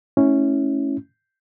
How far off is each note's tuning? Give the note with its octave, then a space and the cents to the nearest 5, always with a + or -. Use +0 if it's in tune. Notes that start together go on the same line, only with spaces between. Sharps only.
A3 +0 C#4 +0 E4 -20